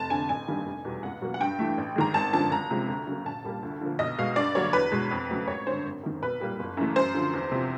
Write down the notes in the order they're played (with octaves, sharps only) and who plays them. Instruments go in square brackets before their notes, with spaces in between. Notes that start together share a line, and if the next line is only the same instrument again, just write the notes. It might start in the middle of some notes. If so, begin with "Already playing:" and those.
Already playing: [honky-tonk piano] F1 A5
F2 D3 G#5
A1 G#5
G2 D#3 G3 A#3
F1
E2 B2 G3
C#2 F#5
B2 F#3 A#3
F#5
G2 G5
E3 A3
A1
G#2 D#3 G#3 A#5
G#1 A5
F#2 D3 F3 A5
C#2 A#5
C3 F3 G#3
D2
C#3 F#3 A#3
A#1 A5
A#2 G3 A#3
D2
D3 F3 A#3
B1 D#5
B2 G#3 F5
G2 D5
D3 F#3 A#3 C#5
E2 B4
B2 G#3
F2
C#3 F#3 A3
G#1 C#5
G2 D3 C5
G#1
F#2 D#3
B1 B4
A#2 G3 A#3
F#1
F#2 C#3 E3 A3
F#2 C5
D3 F3
E2
C3 F3